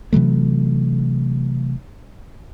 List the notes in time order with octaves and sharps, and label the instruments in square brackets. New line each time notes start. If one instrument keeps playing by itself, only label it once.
[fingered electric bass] C3 E3 F#3 A3